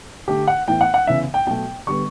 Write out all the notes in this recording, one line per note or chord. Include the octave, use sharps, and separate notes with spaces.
D3 A3 G4
F#5
A2 E3 B3 G5
F#5
F#5
C#3 E3 B3 E5
G5
B2 F#3 A3 G5
D3 G3 B3 C#6